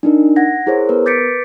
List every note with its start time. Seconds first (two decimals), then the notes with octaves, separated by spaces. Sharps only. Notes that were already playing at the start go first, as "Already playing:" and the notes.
0.03 D4 D#4 A#4
0.36 F#5 G#6 A#6
0.67 E4 G#4 A#4 C5 C#5
0.89 B3 A#4 B4
1.06 D6 G6 A6 B6 C#7 D7
1.18 B4